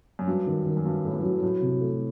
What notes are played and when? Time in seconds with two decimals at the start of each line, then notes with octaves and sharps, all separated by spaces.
0.19 F#2
0.27 G2 F#3
0.47 D#3
0.66 D#3
0.77 F#2
0.85 G2 F#3
1.04 A2 A3
1.14 G2
1.23 F#3
1.42 A2 F#3
1.61 C3
1.81 A3